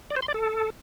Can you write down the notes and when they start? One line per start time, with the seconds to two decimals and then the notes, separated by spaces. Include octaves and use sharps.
0.10 D5
0.16 C5
0.22 C6
0.28 D5
0.34 A4